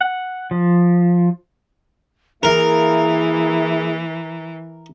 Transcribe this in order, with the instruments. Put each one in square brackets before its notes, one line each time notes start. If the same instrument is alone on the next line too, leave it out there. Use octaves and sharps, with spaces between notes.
[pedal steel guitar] F#5
F3
[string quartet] E3 [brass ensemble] A#3 E4 E5 [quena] G#4 [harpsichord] A#4